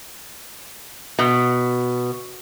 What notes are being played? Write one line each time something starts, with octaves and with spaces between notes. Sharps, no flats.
B2